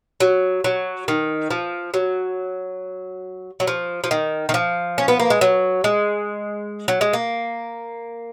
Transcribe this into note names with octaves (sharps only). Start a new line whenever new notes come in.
F#3
F#3
D#3
F3
F#3
F#3
F3
F3
D#3
D#3
F3
C#4
B3
A#3
G#3
F#3
G#3
F#3
G#3
A#3